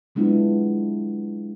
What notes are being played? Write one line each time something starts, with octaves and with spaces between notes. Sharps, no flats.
F#3 G#3 B3 D4 E4 F4